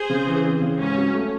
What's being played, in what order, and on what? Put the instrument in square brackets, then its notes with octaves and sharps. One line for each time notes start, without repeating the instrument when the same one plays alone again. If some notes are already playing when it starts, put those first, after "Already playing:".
Already playing: [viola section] G#4 C5
[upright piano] C#3
E3
C4
C#3
[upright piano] G#2 [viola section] C#4
[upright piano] F#3
A3